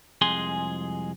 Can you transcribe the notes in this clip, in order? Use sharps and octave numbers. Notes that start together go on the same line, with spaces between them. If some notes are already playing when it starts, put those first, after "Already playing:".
C2 F2 G#3 G#4 C6